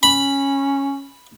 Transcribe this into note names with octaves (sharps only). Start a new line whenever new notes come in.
C#4 B5